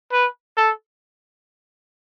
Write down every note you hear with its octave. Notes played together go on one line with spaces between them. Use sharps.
B4
A4